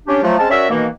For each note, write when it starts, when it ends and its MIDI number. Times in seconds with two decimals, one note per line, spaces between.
0.07 0.20 61
0.07 0.20 62
0.07 0.20 67
0.22 0.36 53
0.22 0.36 54
0.22 0.36 57
0.38 0.49 56
0.38 0.49 60
0.38 0.49 61
0.38 0.49 81
0.50 0.67 61
0.50 0.67 66
0.50 0.67 70
0.50 0.67 74
0.50 0.67 76
0.70 0.87 47
0.70 0.87 51
0.70 0.87 52
0.70 0.87 58